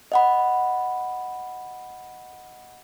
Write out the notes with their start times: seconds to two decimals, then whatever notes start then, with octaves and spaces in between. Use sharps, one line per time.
0.12 D#5 F#5 B5